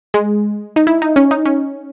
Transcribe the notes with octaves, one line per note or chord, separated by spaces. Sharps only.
G#3
D#4
E4
D#4
C#4
D#4
C#4